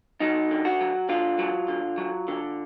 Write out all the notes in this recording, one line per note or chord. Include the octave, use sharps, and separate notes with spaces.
F#3 D#4
D3
F#4
F#3
D3 F4
F#3
D3
F#3
D3